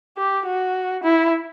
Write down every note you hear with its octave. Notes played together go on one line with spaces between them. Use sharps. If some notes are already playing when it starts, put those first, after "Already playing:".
G4
F#4
E4